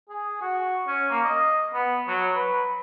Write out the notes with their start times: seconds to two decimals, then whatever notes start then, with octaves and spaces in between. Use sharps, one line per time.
0.09 G#4
0.41 F#4
0.87 C#4
1.09 A#3
1.25 D#5
1.74 B3
2.08 F#3
2.35 B4